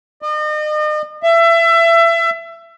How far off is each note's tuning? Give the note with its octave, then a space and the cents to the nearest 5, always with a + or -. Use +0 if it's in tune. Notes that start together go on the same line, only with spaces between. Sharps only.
D#5 -40
E5 +25